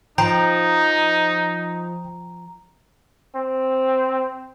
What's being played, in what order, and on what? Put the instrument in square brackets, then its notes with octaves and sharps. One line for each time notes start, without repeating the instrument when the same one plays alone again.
[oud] F3 [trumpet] D#4 [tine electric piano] G5 [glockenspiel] A#5
[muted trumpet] C4